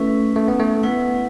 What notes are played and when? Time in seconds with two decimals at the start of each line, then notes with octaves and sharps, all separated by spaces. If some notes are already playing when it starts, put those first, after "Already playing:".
Already playing: A3 C#4 E4 B4
0.36 A3
0.48 B3
0.60 A3
0.83 B3 E4 B4 F#5